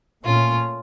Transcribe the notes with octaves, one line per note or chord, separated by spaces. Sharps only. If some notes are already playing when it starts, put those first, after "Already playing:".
A#2 A3 C#4 F4